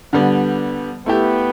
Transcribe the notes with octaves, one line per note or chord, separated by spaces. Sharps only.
D3 G3 B3
A3 B3 E4 G4